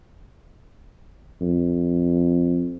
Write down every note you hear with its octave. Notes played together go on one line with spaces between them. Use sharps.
F2